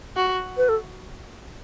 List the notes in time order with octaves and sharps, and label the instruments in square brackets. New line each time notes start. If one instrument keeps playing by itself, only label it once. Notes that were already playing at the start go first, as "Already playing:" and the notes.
[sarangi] F#4
[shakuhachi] B4
A4